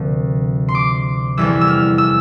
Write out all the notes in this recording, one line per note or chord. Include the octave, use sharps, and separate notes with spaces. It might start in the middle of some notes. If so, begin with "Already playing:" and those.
Already playing: D2 C3 F3 A#3
C6
D6
F1 E2 E3 G3 E6
E6
F6
E6